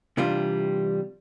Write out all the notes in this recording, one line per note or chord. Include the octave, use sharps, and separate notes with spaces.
C3 E3 G3 D4 F4